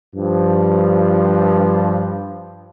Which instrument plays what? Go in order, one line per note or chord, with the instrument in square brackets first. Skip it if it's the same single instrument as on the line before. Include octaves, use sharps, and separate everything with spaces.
[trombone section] G2 F3